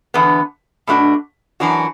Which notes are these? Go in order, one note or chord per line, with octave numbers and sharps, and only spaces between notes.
E2 D3 B3
B2 A3 D4 F#4
F#2 E3 D4 F#4